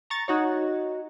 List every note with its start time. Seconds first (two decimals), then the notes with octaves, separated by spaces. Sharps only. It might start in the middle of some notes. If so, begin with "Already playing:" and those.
0.10 A#5 C#6 A6
0.28 D#4 F#4 C#5